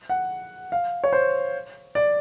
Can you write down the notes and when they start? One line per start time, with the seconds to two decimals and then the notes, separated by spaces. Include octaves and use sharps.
0.09 F#5
0.72 F5
1.04 C#5
1.13 C5
1.95 D5